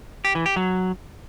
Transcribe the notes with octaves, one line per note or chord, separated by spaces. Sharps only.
G4
E3
G4
F#3